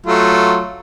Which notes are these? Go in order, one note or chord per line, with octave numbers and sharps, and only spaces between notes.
F#3 A3 F4